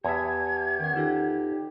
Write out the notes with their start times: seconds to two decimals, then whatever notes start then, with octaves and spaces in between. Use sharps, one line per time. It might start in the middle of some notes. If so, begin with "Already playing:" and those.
0.04 E2 G4 E5 A5 G#6
0.80 D#3 C#4 F#5
0.96 D#4 F4 G4 A4